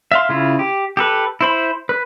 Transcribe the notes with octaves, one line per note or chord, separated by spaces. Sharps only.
E5 F5 C6
C#3 E4 F4
G4
G4 A4 B4
E4 C5 B5
B4